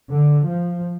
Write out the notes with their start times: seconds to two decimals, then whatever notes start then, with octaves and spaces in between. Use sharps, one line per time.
0.11 D3
0.46 F3